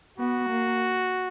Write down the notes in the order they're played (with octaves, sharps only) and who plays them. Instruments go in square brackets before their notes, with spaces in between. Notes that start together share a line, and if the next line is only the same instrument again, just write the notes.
[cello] B3 [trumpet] F#4
[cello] A#3